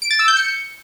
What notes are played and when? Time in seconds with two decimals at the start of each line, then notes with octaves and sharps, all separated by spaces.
0.02 D7
0.11 A6
0.19 E6
0.28 G6
0.37 C#7